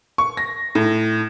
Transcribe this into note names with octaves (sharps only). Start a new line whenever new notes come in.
C#6
A#6
A2